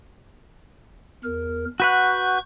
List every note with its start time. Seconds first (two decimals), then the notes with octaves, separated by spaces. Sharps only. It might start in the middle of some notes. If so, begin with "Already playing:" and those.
1.24 E2 A#4
1.80 F#4 B4 F#5 C#6 F#6 G6